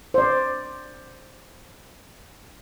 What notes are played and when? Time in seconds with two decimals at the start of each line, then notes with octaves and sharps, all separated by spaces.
0.14 C5 D5